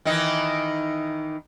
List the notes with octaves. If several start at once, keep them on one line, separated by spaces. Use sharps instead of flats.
D#3 E3 D#4